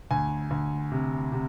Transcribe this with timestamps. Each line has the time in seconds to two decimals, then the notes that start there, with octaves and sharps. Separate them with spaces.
0.11 D2 G#5
0.51 D2
0.92 C3
1.32 C3